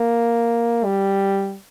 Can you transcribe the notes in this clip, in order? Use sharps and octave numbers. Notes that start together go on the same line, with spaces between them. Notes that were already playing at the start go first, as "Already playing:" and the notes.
Already playing: A#3
G3